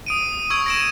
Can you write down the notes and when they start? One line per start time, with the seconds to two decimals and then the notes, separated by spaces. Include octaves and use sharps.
0.06 D#6 D7 D#7
0.50 C#6 E6 G#6 D7
0.66 A#6 D7 E7